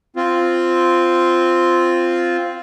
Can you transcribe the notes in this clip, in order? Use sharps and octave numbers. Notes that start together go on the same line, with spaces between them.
C4 F4